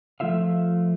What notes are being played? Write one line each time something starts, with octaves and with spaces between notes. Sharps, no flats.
F3 A3 F4 E5 F5